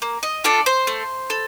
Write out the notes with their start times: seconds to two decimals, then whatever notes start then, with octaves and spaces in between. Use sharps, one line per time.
0.02 A#3
0.23 D#5
0.44 D4 F4 A4 D5
0.66 C5
0.87 A3
1.30 A4